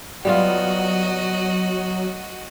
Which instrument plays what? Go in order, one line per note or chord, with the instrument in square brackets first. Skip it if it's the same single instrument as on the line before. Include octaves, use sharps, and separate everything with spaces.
[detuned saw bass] F#3 [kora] G3 B3 F4 [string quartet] F#4 D#5